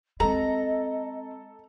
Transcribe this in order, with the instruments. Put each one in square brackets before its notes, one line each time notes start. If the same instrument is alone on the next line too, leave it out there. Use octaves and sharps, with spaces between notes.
[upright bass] G#3 C4 [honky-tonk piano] A4 [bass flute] D#5 [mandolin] A#5